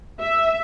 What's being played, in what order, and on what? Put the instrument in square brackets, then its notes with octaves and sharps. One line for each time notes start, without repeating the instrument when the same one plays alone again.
[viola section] E5